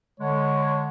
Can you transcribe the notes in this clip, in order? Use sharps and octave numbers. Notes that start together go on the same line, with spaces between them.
D3 G#3 C#5